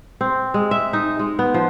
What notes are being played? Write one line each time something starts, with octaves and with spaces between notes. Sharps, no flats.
C4
G#3
E5
D#4
G#3
B3
F3